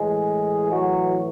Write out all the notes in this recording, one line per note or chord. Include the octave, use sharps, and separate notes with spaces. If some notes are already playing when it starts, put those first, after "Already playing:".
Already playing: A2 E3 G#3 G#4
F#3 F#4